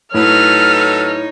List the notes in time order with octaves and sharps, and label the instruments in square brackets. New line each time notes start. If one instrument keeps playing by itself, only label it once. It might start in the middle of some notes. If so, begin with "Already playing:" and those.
[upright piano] A2 [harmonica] F#3 A4 B4 [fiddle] D#4 C#5 [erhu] F6